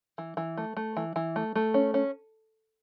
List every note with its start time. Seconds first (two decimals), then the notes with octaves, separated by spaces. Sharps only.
0.18 E3
0.37 E3
0.57 A3
0.77 A3
0.97 E3
1.16 E3
1.36 A3
1.55 A3
1.74 C#4
1.94 C#4